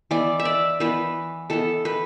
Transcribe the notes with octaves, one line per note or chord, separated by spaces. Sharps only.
E3 B3 D5
E5
D5
E3 B3 B4
E3 B3 A4
B4